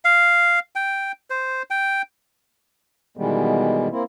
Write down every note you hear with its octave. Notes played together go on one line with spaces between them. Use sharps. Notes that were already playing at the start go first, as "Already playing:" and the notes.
F5
G5
C5
G5
B2 D#3 E3 G3 G#3 B3
A#3 C4 E4